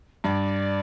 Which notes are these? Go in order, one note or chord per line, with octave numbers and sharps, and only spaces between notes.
G2 D5